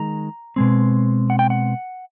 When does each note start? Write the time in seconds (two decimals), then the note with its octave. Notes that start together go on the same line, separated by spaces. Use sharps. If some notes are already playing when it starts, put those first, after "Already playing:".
Already playing: D#3 G#3 A#5
0.56 B2 G#3 C4
1.30 F#5
1.39 G5
1.50 F#5